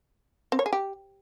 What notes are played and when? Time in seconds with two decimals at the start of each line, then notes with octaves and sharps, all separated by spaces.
0.52 C4
0.59 C#5
0.66 G#4
0.73 G4